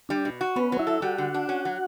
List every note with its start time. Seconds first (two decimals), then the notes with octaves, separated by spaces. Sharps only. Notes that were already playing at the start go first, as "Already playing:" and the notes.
0.09 G3 D4
0.25 B2
0.41 F#4
0.56 B3 C#4 B4
0.72 F#3
0.79 E4 E5
0.87 A4
1.02 G3 F#4 F#5
1.18 D3
1.34 D4
1.49 C#4
1.65 F#3